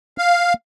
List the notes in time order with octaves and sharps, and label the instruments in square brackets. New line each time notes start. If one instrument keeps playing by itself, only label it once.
[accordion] F5